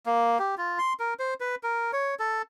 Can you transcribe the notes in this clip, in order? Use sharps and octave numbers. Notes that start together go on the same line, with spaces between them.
A#3
G4
F4
C6
A#4
C5
B4
A#4
C#5
A4